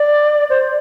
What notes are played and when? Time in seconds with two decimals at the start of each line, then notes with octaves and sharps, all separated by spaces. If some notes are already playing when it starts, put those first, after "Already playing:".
Already playing: D5
0.50 C5